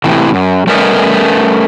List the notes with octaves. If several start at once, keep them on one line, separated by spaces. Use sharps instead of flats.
A2 C3 E3
F#2
G3 A3 C#4 A#4 B4 D#5